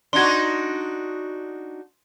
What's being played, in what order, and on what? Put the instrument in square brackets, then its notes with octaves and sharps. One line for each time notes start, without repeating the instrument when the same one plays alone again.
[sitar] D4 D#4 F#4 [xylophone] C6 G#6